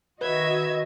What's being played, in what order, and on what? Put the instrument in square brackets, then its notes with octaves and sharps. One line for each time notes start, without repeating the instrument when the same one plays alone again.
[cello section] D#3 F#4 D#5 [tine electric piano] B4 [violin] E5 G#6